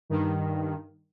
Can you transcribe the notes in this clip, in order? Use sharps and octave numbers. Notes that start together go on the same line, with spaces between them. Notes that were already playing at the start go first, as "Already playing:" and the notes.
G2 D#3